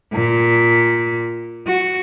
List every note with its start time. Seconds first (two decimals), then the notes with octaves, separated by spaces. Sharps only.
0.13 A#2
1.67 F#4